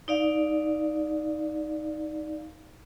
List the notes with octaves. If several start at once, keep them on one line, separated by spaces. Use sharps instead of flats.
D#4 D5 F5